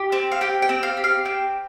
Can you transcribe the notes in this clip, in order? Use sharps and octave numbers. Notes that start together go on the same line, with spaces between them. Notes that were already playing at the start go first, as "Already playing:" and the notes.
Already playing: G4
C4
F5
G4 G5
G5
C4
F5
G4
F5
C4 G5